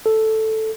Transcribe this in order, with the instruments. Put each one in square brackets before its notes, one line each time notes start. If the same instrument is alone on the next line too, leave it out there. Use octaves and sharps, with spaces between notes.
[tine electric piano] A4